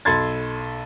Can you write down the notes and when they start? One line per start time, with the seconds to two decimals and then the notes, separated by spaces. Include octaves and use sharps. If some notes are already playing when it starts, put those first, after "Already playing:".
0.05 B1 A4 B5 C6 G#6 A6